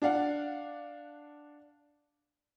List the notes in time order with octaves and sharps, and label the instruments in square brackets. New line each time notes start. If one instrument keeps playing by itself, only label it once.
[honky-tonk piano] D4 D5 F5 F#5